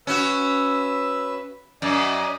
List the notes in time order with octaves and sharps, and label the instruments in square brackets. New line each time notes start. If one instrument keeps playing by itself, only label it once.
[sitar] C#4 F#4 [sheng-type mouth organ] B4 E5 E6
[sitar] F#2 [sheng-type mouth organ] D5 D#5 G#5